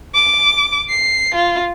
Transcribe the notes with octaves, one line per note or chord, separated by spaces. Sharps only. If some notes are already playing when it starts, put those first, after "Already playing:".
D6
C7
F4